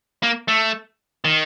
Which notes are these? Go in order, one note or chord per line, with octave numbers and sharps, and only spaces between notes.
A#3
A3
D#3